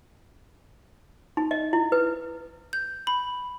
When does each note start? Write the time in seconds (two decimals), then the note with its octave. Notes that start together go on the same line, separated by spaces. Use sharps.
1.37 D#4
1.51 D#5
1.73 E4
1.92 B4
2.73 G6
3.07 B5